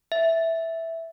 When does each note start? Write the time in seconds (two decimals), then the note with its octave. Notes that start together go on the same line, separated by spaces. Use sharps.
0.12 E5